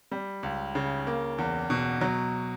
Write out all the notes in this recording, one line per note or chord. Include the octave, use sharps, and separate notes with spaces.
G3
C#2
C#3
A#3
E2
B2
F#3